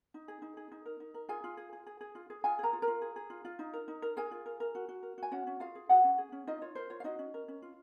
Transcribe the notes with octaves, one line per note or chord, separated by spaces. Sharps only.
D#4
G#4
D#4
G#4
D#4
A#4
D#4
A#4
F4 G#4 G#5
F4
G#4
G#4
G#4
G#4
F4
G#4
F4 G#4 G#5
G#4 A#4 A#5
F4
A#4 A#5
F4
G#4
G#4
F4
F4
D#4
A#4
D#4
A#4
G#4 A#4 G#5
F4
A#4
A#4
F#4
F#4
A#4
F#4 G#5
C#4 F#4 F#5
C#4
F4 G#4 F5
G#4
F#4 G#4 F#5
C#4
G#4
C#4
D#4 F4 D#5
F4 C#5
A#4 C5
F4 C#5
F5
D#4 F#4 D#5
C#4
A#4
C#4
F4